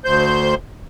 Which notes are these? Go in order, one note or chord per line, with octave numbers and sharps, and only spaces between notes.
D2 C5 G6